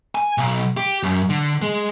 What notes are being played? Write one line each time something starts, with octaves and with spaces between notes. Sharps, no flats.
G#5
B1
G4
F#2
D3
G#3